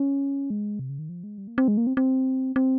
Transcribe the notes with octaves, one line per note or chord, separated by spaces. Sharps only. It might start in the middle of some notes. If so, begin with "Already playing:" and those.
Already playing: C#4
G#3
C3
C#3
D#3
F3
G#3
G3
A#3
C4
G#3
A#3
C4
C4
C4